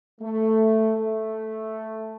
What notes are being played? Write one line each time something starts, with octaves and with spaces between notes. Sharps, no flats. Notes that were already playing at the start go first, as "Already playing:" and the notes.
A3
A3